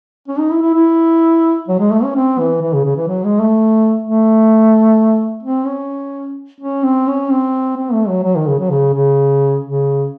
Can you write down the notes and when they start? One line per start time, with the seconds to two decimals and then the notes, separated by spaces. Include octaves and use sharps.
0.28 C#4
0.39 D#4
0.51 E4
0.62 E4
0.74 E4
1.68 F#3
1.79 G#3
1.91 A3
2.03 C#4
2.15 C4
2.39 E3
2.62 E3
2.74 C#3
2.85 C#3
2.96 E3
3.08 F#3
3.24 G#3
3.40 A3
4.03 A3
5.43 C4
5.66 C#4
6.61 C#4
6.83 C4
7.07 C#4
7.30 C4
7.77 C4
7.93 A3
8.08 F#3
8.23 F#3
8.36 D#3
8.48 C#3
8.59 F#3
8.71 C#3
8.94 C#3
9.65 C#3